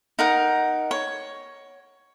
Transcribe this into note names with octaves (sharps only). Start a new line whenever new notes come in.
D#4 A#4 F#5
C#5